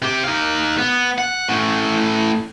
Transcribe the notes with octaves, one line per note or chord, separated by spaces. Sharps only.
C3 G4
D#4 F5
B3
F#5
A2 C#4